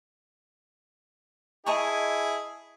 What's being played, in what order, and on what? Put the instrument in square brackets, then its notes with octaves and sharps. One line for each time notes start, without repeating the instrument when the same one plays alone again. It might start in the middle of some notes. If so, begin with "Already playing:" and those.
[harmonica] E4 G#4 [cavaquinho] D#5 A5 C#6